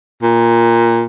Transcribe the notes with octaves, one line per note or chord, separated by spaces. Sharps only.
A#2